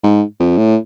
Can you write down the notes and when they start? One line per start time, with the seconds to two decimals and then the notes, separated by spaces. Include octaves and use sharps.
0.03 G#2
0.40 F2
0.58 A2